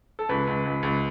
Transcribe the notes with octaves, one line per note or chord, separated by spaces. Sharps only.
A4
C#2 B4
C#2
C#2
C#2